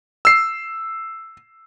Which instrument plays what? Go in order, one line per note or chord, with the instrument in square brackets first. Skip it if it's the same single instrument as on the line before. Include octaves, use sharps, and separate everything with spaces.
[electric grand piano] E6 C7